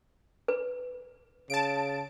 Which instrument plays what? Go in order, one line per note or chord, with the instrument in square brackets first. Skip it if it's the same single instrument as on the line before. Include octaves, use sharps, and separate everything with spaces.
[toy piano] B4
[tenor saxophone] C#3 [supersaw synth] A5 D7